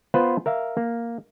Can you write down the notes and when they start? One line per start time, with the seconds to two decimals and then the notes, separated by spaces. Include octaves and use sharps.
0.14 B3 F4 B4 C5
0.46 A#4 E5 F5
0.77 A#3